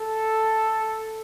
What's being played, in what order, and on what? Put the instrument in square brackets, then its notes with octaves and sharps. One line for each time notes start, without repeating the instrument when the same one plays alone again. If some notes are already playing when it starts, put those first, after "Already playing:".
Already playing: [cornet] A4